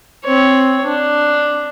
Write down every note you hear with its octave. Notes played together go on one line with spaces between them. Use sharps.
C4 C#5
D4